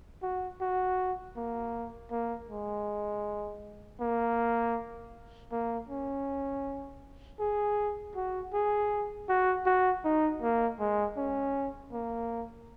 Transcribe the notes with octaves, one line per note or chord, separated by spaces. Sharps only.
F#4
F#4
A#3
A#3
G#3
A#3
A#3
C#4
G#4
F#4
G#4
F#4
F#4
D#4
A#3
G#3
C#4
A#3